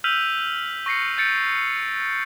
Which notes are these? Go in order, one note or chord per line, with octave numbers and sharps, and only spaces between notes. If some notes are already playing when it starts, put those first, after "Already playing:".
E6 F6 G6 B6 D#7 F7
C#6 A#6 C7 C#7
G6 A6 C#7 D7